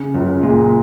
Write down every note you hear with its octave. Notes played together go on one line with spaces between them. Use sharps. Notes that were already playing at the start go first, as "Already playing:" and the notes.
Already playing: C#3
C#2 F#2
A#2 G#3